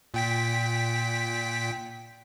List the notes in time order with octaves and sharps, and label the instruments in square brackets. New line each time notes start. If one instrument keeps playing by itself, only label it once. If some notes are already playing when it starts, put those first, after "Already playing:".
[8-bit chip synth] A#2 G5 B6